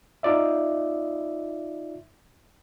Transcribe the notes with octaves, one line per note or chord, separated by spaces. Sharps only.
D#4 F4 D5 E5